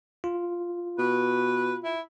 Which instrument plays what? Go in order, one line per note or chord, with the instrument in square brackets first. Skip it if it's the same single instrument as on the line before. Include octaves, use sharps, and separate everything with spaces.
[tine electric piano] F4
[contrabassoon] B2 [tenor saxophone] B4
[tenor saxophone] E4